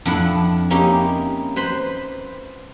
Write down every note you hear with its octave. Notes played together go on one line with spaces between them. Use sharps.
F2 D4 E4 F#5
A#3 C#4 D#4 E4 G4
B4 C5 B5 C6